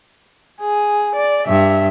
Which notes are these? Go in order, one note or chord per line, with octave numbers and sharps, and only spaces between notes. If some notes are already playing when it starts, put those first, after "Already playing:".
G#4
D5
G2 E5